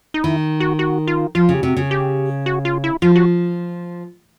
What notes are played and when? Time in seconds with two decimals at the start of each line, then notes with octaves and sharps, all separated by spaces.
0.14 D#4
0.23 D#3 E4
0.60 F#4
0.79 F#4
1.07 F4
1.35 F3 F4
1.49 C#3
1.54 G4
1.62 C3 F#4
1.77 C#3
1.91 G4
2.46 F#4
2.65 F4
2.84 E4
3.02 F3 F4
3.16 F#4